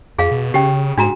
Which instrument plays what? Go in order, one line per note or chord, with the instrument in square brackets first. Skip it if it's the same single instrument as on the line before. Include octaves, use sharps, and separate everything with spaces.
[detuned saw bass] F2 [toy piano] G#4 F5
[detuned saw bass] B2
[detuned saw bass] C#3 [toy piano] G4 G5
[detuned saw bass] G#2 [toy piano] D4 F#4 A#5